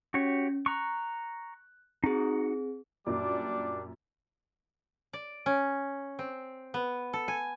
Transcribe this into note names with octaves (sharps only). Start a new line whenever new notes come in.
C#4 F#4 G4 C#5
A#5 C#6 F#6
C4 D#4 F#4 G#4
F#2 A#2 G3 D4 D5 D6
D5
C#4
C4
B3
A4
G#5